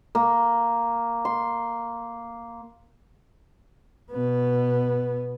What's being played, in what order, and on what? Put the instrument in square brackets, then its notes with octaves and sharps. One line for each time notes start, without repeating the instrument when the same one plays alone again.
[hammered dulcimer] A#3
C6
[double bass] B2 B3